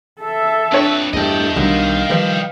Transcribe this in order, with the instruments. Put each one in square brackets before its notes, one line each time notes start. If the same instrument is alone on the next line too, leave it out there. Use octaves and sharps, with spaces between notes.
[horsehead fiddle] A4 E5
[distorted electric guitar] F2 B4 [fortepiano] D4 C#5
[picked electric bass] E2 G2 [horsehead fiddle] A3 [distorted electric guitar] D#5 G5
[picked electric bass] B1 D#3 G3 [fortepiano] D3 F#3 [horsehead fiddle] F5
[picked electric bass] D#3 F3 G3 [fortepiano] B4